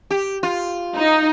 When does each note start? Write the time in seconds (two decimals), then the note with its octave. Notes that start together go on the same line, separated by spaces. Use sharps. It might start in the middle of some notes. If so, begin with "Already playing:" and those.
0.11 G4
0.43 F4
0.96 D#4